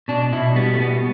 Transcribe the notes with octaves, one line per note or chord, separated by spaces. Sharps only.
B2 D4
B2 E4
G3 B3
A3
B2 B3